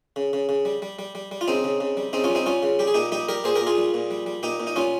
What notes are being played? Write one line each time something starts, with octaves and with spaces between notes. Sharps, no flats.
C#3
C#3
C#3
G3
G3
G3
G3
G3
F4
C#3 C4 D#4
C#3
C#3
G3
C#3 C4 D#4
C#4 F4
G3
C4 D#4
G3 C#4 F4
C#3
G3 G4
G#4
A#2 D#4 G4
G3 D#4 G4
G3 G4 A#4
A#2 G#4 C5
G4 A#4
A#2
F4 G#4
G3
A#2
G3
G3
A#2 D#4 G4
A#2
D#4
G3 C#4 F4